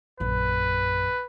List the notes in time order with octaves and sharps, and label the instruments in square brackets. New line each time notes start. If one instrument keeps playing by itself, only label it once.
[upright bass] A#1 F#2 [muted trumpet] B4